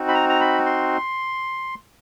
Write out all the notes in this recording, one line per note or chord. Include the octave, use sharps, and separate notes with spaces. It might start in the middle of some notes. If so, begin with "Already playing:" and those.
Already playing: C4 D#4 F#4
B5
A#5
A#5
B5
C6